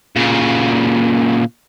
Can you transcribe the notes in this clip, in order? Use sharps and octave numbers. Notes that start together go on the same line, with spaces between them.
A#2 C#3